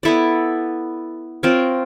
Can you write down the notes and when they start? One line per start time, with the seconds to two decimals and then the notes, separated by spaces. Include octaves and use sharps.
0.03 B3 E4 A4 D5
1.43 C4 F4 A#4 C#5